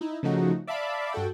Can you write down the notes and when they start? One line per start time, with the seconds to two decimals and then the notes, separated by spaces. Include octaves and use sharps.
0.01 D#4 E4
0.23 C#3 F3 A3 D#4 F#4
0.67 D5 E5 F5 A5 B5 D6
1.13 G2 F#4 A4 G5